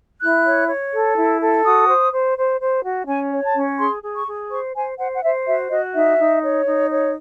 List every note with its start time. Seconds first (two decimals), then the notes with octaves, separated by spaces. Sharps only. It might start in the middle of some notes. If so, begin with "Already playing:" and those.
0.21 E4 F#6
0.45 C#5
0.68 C#5
0.93 A4
1.16 E4
1.41 A4
1.65 F#4 D#6
1.88 C5
2.12 C5
2.37 C5
2.60 C5
2.84 F#4
3.07 C#4 G#5
3.31 C#5
3.44 A5
3.55 C#4
3.79 G#4 C6
4.03 G#4
4.15 C#6
4.27 G#4
4.51 C5 C#6
4.75 C5 G#5
4.98 C5 F#5
5.14 F#5
5.22 C5 E5
5.46 F#4 E5
5.71 F#4 D#5
5.94 D#4 E5
6.18 D#4
6.42 C#5
6.66 D#4
6.90 C#5